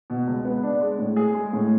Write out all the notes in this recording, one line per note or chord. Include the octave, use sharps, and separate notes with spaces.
B2
C#2
B3
D4
G#3
A2
G#4
G#3
A2